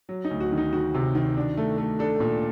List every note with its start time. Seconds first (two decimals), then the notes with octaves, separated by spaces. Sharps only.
0.09 F#3
0.25 D#4
0.31 D2
0.40 F#4
0.52 D#3
0.57 D#4
0.73 D#3 F#4
0.95 C3
1.15 D#3
1.37 D4
1.57 A3
1.78 A3
1.99 D4 A4
2.20 A#2